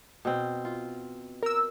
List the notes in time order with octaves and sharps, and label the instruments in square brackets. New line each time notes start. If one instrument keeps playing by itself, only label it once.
[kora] B2 C4
F4
[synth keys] A#4 E6